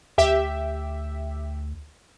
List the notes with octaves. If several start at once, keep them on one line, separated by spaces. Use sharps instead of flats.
D2 G4 E5